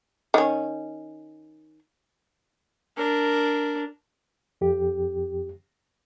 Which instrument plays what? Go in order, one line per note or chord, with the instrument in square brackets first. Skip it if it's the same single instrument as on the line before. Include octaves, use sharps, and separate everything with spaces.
[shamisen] D#3 C#4
[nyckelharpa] D4 A#4
[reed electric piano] F2 G4